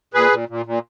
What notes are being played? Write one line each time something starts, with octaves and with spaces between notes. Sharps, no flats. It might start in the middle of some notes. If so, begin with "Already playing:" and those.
A#2 G#4 B4
A#2
A#2
A#2